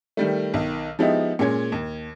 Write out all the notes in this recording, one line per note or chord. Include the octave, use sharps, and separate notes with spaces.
D#3 G3 A3
B1 D#3
F3 G#3 B3 D#4 E4 G4
A#2 G#3 C#4 G#6
D#2